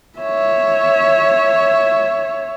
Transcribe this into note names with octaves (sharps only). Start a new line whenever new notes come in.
C#5 E5